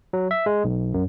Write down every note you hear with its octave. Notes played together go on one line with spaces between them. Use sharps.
F#3
E5
G#3
B1
F#2